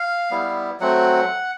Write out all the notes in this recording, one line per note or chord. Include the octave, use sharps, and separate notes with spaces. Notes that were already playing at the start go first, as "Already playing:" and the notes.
Already playing: F5
G3 B3 E4
F#3 A3 C4 F#5